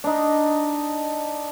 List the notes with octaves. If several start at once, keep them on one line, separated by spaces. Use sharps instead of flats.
D4 D#4